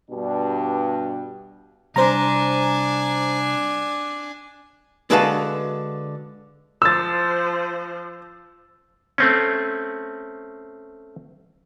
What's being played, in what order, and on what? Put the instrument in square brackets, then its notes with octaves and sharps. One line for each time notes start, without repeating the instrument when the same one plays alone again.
[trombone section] G2 B2 D4 G4
[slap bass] C3 G3 [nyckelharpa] D4 G#5 [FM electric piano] C5 A#5
[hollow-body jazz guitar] D3 G#3 F#4 B4 F5 A5
[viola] F3 C5 [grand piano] E6 A6
[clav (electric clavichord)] A3 C4 C#4